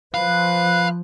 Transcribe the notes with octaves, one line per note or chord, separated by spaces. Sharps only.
F3 B4 F5 F#6